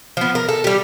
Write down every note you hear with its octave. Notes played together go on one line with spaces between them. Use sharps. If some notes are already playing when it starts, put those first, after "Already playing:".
F3 B3
A#4
A4
G3 G4